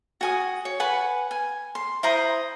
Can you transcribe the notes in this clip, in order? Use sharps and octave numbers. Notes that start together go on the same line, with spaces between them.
F#4 G#5 D#6
C#5
B4 F#5 G#5
G#5
C6
E4 C5 A#5 D#6